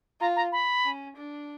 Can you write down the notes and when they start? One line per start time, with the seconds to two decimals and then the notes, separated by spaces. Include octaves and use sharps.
0.20 F4 A#5
0.36 A#5
0.52 B5
0.85 C#4
1.16 D4